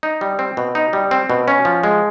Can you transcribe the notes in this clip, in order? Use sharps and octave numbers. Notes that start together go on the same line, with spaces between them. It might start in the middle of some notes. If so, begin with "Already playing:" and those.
D#4
G3
C4
B2
D#4
G3
C4
B2
C#4
F3
G#3